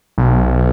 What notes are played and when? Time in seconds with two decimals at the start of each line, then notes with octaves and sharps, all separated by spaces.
0.18 B1